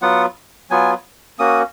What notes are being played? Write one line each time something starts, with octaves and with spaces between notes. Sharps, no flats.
F#3 B3 F4 F#5
F#3 B3 F4 G#5
A#3 C#4 F#4 D#6